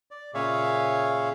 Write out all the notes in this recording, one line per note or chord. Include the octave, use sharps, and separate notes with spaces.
D5
A#2 C#3 G#4 C#5 E5 F5